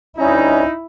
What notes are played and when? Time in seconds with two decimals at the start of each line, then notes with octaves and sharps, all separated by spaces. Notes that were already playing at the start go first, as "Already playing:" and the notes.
0.18 D2 G3 C#4 D#4 E4 A#5